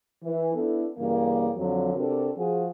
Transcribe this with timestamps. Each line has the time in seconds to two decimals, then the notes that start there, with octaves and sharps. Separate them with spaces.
0.23 E3
0.54 B3 D4 E4 A4
0.97 G2 C#3 E3 A#3
1.56 F2 D3 F#3
1.95 C3 D4 F#4 A4 A#4
2.36 F3 F#4 G#4